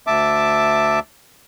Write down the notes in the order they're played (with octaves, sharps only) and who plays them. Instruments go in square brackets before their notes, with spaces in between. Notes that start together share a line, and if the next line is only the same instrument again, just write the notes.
[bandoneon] D2 E5 A5 D6